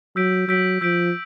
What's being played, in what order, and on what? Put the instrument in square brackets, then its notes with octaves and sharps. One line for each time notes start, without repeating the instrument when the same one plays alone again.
[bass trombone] F#3 [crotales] E6 G6 B6 D7
[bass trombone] F#3 [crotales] E6 G6 B6 D7
[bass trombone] F3 [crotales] E6 G6 B6 D7